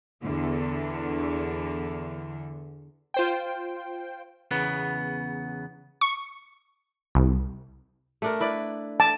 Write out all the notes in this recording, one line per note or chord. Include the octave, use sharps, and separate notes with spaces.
E2 D3
F4 C5 G5
E2 C#3 B3
C#6
C2
A3 D4 A#4
E4 B4 D5
A5